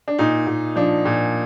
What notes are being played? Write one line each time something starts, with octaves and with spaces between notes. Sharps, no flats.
D4
A#2 D#4
A#2
F3 D4
A#2